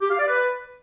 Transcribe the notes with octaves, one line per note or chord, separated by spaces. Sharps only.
G4
F5
D5
B4